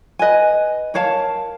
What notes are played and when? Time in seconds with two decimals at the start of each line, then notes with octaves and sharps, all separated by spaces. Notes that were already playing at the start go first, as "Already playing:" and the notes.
0.19 B4 D#5 G#5
0.94 A#4 C#5 F5 A5